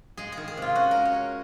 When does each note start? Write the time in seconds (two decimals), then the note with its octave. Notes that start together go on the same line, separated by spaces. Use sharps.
0.17 G#3 G#4
0.32 D#3 G#4
0.48 G#4
0.57 C3 F4
0.75 C#4 F#4
0.91 G#3 A#4
1.05 C#5
1.14 C#4